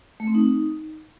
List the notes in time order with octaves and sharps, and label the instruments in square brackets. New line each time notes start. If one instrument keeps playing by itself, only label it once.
[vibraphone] A3
C4
D#4